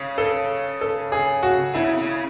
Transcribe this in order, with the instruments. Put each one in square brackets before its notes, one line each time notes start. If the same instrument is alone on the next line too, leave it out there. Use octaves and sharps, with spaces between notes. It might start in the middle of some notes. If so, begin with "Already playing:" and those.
Already playing: [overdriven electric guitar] C#3
[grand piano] A4
A4
G#4
F#4
[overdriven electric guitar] C#3 [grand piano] E4
[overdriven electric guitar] C#3